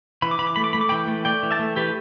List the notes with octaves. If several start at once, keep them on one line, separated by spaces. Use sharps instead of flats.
E3 B5
D6
E3 B5
D6
A3 B5
D6
A3 B5
D6
E3 G5 B5
A3
A3 D5 G5
E3
E5 A5
A3
E3 G4 B4